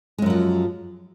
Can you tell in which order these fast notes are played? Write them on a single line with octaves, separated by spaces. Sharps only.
G#3 F#2 F#3 F3